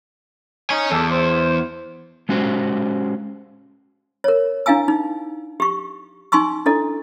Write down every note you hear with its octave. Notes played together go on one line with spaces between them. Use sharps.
D#4 C#5 G#5
E2 A4
C5
G#3 C#4 F#4 G4 C5
A#4 C#5
D4 E4 F5 G#5 E6
D#4
G4 C#6
D#4 G#5 C6 C#6 E6
D4 E4 A4 D#5